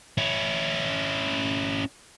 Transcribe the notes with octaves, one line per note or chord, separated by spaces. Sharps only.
C#4 E4